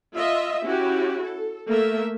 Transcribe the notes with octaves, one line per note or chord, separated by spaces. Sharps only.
F4 D#5 E5
C#4 E4 F#4 G4
A4
A3 A#3 A#4 E5